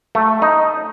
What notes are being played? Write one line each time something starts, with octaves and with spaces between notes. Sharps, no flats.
A3
D#4